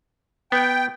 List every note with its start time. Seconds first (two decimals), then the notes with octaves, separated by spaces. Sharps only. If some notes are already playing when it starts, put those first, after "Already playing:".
0.52 B3 G5